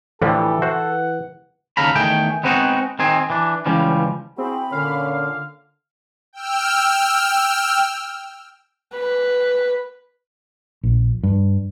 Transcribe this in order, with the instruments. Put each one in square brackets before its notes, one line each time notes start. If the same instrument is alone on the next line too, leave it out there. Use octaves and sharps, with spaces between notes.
[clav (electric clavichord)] A2 D3 F3 [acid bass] E3 [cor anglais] G4 [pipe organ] A4
[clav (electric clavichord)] F#4 C5 [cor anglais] F#5
[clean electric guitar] D#2 C#3 A4 F5 A#5 B5
E2 D#3 A3 G#4 G5
G#3 B3 C4 D#4 F#4
D#3 C4 G#4
E3 D4
C#2 C#3 E3 F3 G3
[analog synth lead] C4 [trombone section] E4 F#4 G#4 [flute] B5
[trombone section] A#2 C#4 [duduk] D3 [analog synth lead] F5
[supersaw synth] G5 E6 F6
[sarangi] B4
[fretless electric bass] A#1
G2